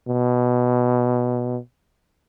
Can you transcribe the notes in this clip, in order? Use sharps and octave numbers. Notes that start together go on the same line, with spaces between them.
B2